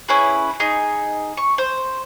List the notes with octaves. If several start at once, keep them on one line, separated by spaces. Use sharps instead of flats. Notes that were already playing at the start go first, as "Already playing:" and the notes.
C#4 E4 G#4 B4
D#4 G#4
C#6
C5